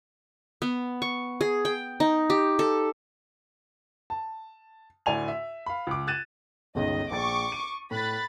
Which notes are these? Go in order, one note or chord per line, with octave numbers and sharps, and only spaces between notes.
B3
C#6
G#4
G5
D#4
G4
A4
A5
D2 A2 D5 G#5 F7
E5
F5 B5
C#2 D6
F#6 G#6 A6 D#7 E7
G1 C#2 D#3 D#5
A#1 C#6 D6 A6
D#7
A2 B5 F#6 A6